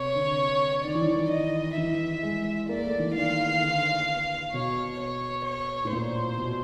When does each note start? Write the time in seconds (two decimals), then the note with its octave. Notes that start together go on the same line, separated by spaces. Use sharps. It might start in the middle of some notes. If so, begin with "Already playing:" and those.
Already playing: C3 C#5
0.15 D3
0.85 D#3 D5
0.95 E3
1.06 D#3
1.31 D#5
1.77 E3 E5
2.23 G#3
2.69 A#3 D5
2.85 A3
2.99 E3
3.15 D#3 F5
3.61 D3
4.53 B2 C#5
5.00 C#5
5.45 C#5
5.85 A2
5.92 A#2 C5
6.38 B2